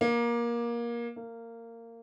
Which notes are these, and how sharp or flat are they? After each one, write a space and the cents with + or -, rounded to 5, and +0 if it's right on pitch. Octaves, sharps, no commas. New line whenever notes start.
A#3 +20
A#3 -20